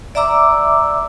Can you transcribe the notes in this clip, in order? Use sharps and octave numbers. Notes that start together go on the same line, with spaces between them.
D5 E5 A#5 D6 E6